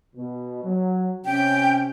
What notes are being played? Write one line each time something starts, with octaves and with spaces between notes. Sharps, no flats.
B2
F#3
C3 C#4 G5